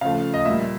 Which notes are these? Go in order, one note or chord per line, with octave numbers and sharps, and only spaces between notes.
C#3 F3 A3 F5
D#5
A#2 G3 E5